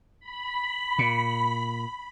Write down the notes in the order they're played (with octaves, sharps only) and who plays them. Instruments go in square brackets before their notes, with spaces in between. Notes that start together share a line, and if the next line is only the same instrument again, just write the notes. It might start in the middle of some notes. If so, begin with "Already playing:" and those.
[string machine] B5
[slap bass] A#2